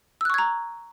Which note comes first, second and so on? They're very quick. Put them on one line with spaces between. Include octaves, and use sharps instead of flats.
E6 F#6 C#6 G#6 A#5